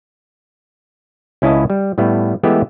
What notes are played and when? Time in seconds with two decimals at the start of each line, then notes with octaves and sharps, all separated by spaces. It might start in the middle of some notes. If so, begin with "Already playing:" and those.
1.42 C#2 C#4 E4 B4 D#5 A5
1.70 G3
1.98 A2 G3 A3 B3
2.43 E3 G#3 A3 B3 G4 E5